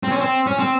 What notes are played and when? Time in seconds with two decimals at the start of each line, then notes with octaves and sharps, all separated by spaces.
0.03 C4
0.12 C#4
0.20 C4
0.47 C#4
0.59 C4